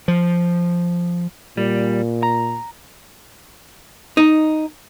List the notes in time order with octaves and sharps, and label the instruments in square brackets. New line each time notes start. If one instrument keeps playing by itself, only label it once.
[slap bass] F3
[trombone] A#2 [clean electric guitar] G3
[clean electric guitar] A#5
[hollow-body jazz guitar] D#4